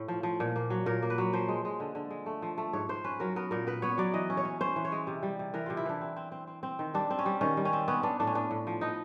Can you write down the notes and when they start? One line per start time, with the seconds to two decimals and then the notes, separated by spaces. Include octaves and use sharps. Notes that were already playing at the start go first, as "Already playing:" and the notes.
Already playing: A2
0.08 F3
0.23 F3
0.40 A#2
0.56 A#3
0.70 F#3
0.86 A#2 A#4
1.03 A#3
1.10 B4
1.18 F#3
1.33 F3 C5
1.48 G#3
1.65 G#3
1.80 D3
1.95 D3
2.10 G#3
2.26 A3
2.42 F3
2.58 A3
2.73 G#2 C#5
2.89 G#2 C5
3.04 C#4 B4
3.20 F#3 A#4
3.36 B3 A#4
3.51 A#2 A#4
3.67 B3 B4
3.82 B3 C#5
3.98 F#3 D5
4.14 E3 D#5
4.30 C#4
4.37 C#5
4.45 C#4
4.61 C#4 C5
4.76 E3
4.85 C#5
4.92 G#3
5.07 C3
5.23 G3
5.39 C3
5.54 E3 A#4
5.66 C3 F4
5.77 E4
5.86 E3 D4
6.01 C4
6.16 C4
6.32 C4
6.47 C4
6.63 C4
6.79 D#3
6.94 G3 D4
7.10 C4
7.19 C#4
7.26 G3
7.41 D#3 C#4
7.57 G3
7.65 C#4
7.73 C4
7.88 B3 C#4
8.03 B3 D4
8.20 A2 D4
8.27 C#4
8.35 B3 D4
8.51 A2
8.67 F3
8.81 B3 D#4